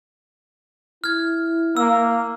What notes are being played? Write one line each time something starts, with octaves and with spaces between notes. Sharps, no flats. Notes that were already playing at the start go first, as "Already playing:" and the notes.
E4 F6 G#6
A#3 E6